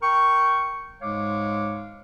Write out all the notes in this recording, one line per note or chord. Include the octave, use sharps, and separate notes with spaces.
A#4 G5 C#6
G#2 G#3 C#5 F5 D6